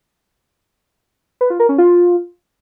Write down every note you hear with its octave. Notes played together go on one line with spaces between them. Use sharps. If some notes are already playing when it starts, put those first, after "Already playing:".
B4
F4
A#4
C#4
F4